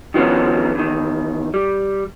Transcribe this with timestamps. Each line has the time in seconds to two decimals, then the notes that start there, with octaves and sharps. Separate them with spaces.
0.14 D#3 F3 B3 C#4
0.75 E2 D#3
1.54 G3